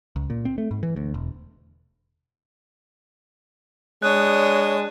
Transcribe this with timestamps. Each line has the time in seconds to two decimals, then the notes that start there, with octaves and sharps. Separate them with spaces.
0.16 C#2
0.30 A#2
0.45 C4
0.58 A3
0.71 G#2
0.83 E3
0.96 D2
1.14 E1
4.02 G#3 D4 C#5 D#6 F#6